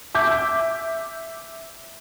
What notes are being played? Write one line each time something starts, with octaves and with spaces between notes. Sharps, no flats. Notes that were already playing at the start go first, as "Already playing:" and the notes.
E5 D6 G6